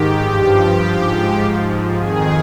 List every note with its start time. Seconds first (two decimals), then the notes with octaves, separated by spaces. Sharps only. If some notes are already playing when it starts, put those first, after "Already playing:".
Already playing: G#2 D#3 G4
0.25 G2 F3
0.82 G#2 F3
1.39 G#2 F3
1.96 F2 D#3 G#4